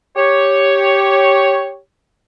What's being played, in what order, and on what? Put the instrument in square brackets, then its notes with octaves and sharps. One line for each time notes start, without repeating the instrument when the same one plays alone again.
[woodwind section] G4 C#5